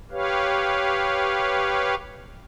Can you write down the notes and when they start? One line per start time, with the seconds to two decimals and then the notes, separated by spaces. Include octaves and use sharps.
0.12 G4 B4 C#5 F5